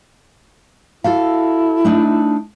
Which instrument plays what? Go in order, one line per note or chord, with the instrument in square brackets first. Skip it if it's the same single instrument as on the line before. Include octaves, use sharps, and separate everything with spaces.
[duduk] E4 [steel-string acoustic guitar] F#4 A4 F5
[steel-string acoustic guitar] A3 D4 D#4